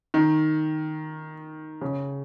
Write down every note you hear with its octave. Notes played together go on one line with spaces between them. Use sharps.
D#3
C#3